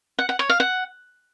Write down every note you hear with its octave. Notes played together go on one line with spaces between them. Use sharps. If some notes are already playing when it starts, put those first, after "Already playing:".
F#5
F#5
C#5
F5
F#5